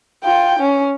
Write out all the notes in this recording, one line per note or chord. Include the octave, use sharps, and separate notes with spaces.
F4 G5
C#4